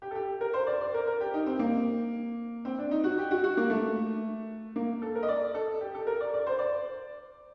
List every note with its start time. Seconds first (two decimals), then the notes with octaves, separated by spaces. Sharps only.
0.02 G4
0.11 A4
0.15 G4
0.41 A#4
0.54 C5
0.67 D5
0.81 D5
0.94 A#4
1.07 A#4
1.21 G4
1.34 D#4
1.46 C4
1.59 A#3
2.65 C4
2.79 D4
2.91 D#4
3.04 F#4
3.18 G4
3.31 F#4
3.44 F#4
3.57 A#3
3.70 A3
4.76 A#3
5.02 A4
5.15 A#4
5.23 D#5
5.28 D5
5.54 A4
5.81 G4
5.95 A4
6.07 A#4
6.20 D5
6.34 D5
6.46 C5
6.59 D5